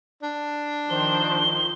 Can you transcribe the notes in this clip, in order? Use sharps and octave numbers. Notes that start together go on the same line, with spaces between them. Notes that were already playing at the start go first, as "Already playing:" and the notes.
D4
D#3 F3 C5 G7